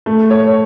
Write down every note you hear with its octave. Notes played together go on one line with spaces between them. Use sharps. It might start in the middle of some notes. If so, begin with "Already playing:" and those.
A3
C#5